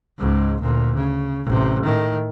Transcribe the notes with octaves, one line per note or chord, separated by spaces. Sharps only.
C#2 G#2
D2 A#2
C#3
A1 C3
A2 D#3